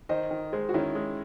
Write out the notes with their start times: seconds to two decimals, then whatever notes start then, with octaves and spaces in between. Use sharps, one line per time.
0.09 D#3 C5 D#5
0.31 D#3
0.53 G#3 G#4 C5
0.69 F#4
0.74 D#3 C#4 E4
0.95 G#3